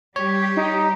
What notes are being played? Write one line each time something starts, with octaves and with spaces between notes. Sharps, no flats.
G3 G4 C#5
D#4